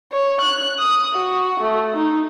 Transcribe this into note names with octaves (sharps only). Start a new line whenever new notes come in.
C#5
F#6
D#6
F#4
A3
D#4